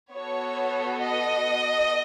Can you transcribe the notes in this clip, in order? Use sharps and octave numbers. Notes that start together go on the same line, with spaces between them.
B3 F#4 A4 C#5
D#5